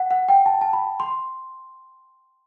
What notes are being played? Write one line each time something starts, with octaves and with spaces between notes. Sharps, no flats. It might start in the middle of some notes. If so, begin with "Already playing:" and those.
Already playing: F#5
F#5
G5
A5
A5
B5
C6